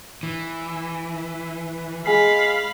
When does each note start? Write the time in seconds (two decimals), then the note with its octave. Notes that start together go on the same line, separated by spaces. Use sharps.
0.23 E3
2.06 G#3 G#4 F5 G#5 B5 C7